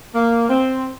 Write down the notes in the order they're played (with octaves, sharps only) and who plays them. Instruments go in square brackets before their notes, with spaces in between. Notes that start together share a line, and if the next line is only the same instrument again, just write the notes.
[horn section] A#3
C4